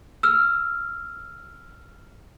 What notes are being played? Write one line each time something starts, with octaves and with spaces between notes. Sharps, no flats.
E6 F6